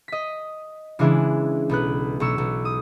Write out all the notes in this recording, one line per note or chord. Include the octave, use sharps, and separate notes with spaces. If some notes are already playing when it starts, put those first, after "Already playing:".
D#5 B6
C#3 E3 G#3 D4 E4
B1 B3 F#6
B1 F#3 C#6 E6
B1
D#6